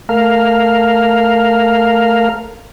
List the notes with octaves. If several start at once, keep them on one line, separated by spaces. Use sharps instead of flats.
A3 A#4 F5